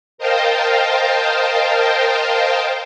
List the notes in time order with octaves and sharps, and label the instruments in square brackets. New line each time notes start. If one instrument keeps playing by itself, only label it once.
[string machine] A#4 C5 D#5 F5 G5 A5